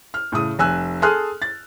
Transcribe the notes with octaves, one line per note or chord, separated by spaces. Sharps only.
F6
A2 C#3 D#6
F1 G#5 E6 F#6
G#4 A4 C6 D#6 F6 F#6
A6